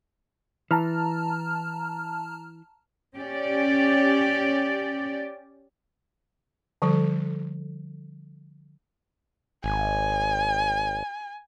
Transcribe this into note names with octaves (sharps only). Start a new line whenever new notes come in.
E3 A5 A#5 F6
C#4 G4 D5
D3 F3 G3 A4
G#1 G#5